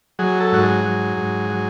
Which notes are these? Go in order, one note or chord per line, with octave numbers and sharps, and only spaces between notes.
F#3 G#4
A4
G#2 F#4
G#4
F#3
G#2
F#3